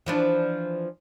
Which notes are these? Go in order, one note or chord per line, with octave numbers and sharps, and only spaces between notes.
E3 F3 D4